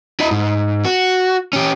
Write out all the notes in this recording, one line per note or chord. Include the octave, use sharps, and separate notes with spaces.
E4 D#5
G#2
F#4
C#4 G4